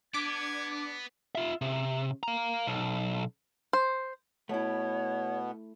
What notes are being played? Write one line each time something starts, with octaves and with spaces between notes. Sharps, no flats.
B3 D4 D6 G#6
F4 E5
C3
F5 A#5
B1
C5
B2 A3 B3 E4 C#5